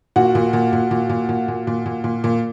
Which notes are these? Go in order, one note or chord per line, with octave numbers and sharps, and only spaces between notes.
A#2 F#4
A#2
A#2
A#2
A#2
A#2
A#2
A#2
A#2
A#2
A#2
A#2